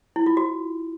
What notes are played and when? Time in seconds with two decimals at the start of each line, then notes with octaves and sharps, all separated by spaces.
0.16 E4
0.26 F4
0.37 F#4